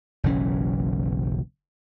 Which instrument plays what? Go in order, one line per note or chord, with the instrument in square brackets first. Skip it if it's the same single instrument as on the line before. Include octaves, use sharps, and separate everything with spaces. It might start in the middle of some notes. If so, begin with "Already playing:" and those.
[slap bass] F#1 B1 E3 C#4